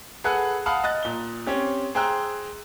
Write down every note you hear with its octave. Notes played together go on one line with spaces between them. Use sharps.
G#4 A4 B4 F#5 E6 F#6
F5 F#5 A5 B5 D#6 F6
D#5 F#6 A6
A#2 G7
C4 C#4 G4
G#4 C5 G5 A#5 E6 F#6